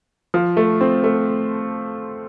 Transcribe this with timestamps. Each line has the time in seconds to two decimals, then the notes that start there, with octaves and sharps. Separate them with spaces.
0.34 F3
0.57 A3
0.81 C4
1.04 A3